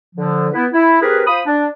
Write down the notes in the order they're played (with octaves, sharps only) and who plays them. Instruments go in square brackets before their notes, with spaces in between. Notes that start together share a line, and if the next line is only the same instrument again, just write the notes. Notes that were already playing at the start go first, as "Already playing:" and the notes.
[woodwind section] D3 F3
B3 E4 B4
E4
C4 G4 G#4 A#4 B4
F4 C5 B5 D#6
D4